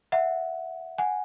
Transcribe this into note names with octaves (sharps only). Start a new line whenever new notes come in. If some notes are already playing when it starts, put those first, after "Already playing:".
E5 F#5
F#5 G#5